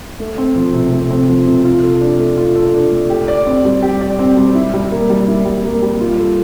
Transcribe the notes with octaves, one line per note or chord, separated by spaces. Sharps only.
A3
C4
F3
C3
A3
C4
F3
C3
F4
A4
D4
A3
F4
A4
D4
A3
G4
D5
C4
G3
G4
D5
C4
G3
E4
G3
A#3
G3
E4
G3
A#3
G3
F4
A4